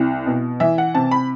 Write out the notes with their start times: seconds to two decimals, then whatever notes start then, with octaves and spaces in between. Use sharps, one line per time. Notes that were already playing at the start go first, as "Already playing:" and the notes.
Already playing: C2
0.27 B2
0.60 E3 E5
0.78 F#5
0.95 C3 A5
1.11 B5